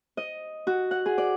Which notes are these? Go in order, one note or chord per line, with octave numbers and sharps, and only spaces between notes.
D#5
F#4
F#5
G#4
D5